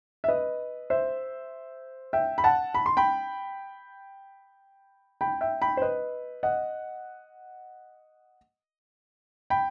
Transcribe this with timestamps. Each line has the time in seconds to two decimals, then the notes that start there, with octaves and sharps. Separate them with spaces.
0.24 E5
0.28 B4 D#5
0.90 C5 E5
2.13 E5 G5
2.38 B5
2.44 F#5 A5
2.74 B5
2.86 C6
2.97 G5 B5
5.21 G5 B5
5.41 E5 G5
5.62 G5 B5
5.77 C5
5.82 B4 D#5
6.43 D#5 F#5
9.50 G5 B5